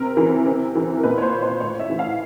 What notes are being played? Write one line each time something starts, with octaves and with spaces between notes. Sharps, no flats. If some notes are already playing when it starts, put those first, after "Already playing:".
Already playing: C3 A#4
E3
C3
E3
A#4
A#2 B4
C#5
C5
C5
A2 C#5
E5
E3
F5